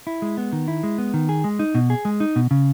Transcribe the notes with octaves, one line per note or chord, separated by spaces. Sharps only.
E4
G#3
B3
D#3
E4
G#3
B3
D#3
G#4
G#3
D#4
B2
G#4
G#3
D#4
B2
C#3